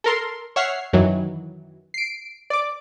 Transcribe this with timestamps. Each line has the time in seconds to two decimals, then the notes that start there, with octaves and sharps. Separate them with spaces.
0.04 A4 A#4 C6
0.56 C#5 E5 F#5 F6 C7
0.93 F#2 D#3 E3 F#3
1.94 C7 D7
2.50 D5 D6